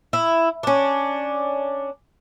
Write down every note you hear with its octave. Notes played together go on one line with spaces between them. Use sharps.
E4
C#4 D4